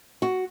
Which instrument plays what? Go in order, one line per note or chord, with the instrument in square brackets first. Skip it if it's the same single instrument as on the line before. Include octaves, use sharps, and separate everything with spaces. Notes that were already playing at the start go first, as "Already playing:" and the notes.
[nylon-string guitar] F#4